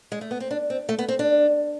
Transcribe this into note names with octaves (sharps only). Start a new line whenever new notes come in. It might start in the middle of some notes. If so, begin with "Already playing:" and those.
G#3
A3
B3
C4
D4
C4
A3
B3
C4
D4